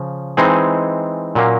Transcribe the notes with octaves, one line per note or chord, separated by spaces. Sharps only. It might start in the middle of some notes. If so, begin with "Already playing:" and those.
Already playing: C#3 F3
E3 G#3 C4 D#4 G#4
A#2 F#3 A#3 C#4